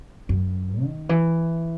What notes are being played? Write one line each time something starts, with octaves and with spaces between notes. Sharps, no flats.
F#2
D#3
E3